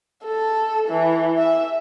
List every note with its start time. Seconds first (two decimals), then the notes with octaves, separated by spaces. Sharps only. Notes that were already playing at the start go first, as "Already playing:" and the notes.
0.24 A4
0.89 E3
1.38 E5